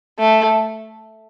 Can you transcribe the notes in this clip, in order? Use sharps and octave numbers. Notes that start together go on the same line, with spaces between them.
A3